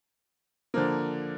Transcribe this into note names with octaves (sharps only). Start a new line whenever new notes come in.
D3 F3 A#3